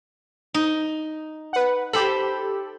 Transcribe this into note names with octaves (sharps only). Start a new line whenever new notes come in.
D#4
B4 F#5
G4 A4 C5 B5